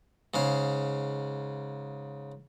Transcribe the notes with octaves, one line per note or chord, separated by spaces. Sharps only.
G#2 C#3 F5